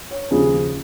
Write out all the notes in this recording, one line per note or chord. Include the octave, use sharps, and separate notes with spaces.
C#5
D#2 C#3 F3 G#4